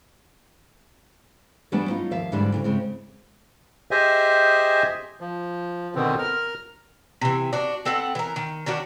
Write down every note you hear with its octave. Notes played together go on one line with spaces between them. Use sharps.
E3 F#3 G3 A3 B3 D4
C#4 D#4 F4
D#2 F3 E5 F5
E2 G#2 D3 E3 G3 D4
D2 A2 C#3
C#3 G#3 C4
G4 G#4 C5 D#5 E5 G#5
F3
B2 D3 D#3 B3 C4
A#4 F6
C3 E3
D4 F#4
C4 A4 B4 F#5
E3 A#4
D#3
D#3 C#4 D4 F#4